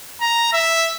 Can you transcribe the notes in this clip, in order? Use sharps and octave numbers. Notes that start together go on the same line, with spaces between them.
A#5
E5